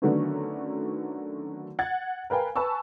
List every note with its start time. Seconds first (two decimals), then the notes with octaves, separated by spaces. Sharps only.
0.02 D3 D#3 F#3 A3 B3 C#4
1.79 F#5 G#6 A6
2.30 A#4 B4 F5 G5 G#5
2.56 B4 G#5 A5 C#6 E6